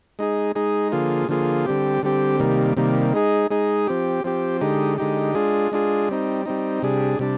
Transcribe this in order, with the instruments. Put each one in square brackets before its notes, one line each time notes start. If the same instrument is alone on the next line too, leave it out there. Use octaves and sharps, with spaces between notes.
[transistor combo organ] G#3 D#4 G#4
G#3 D#4 G#4
D3 F3 A#3 F4 G#4
D3 F3 A#3 F4 G#4
D3 G3 C4 G4
D3 G3 C4 G4
C3 D#3 G3 A#3
C3 D#3 G3 A#3
G#3 D#4 G#4
G#3 D#4 G#4
F3 C4 G4
F3 C4 G4
D3 G#3 D#4 G4
D3 G#3 D#4 G4
G#3 D4 F4 G#4
G#3 D4 F4 G#4
G3 C4 D#4
G3 C4 D#4
C3 G3 D4 G#4
C3 G3 D4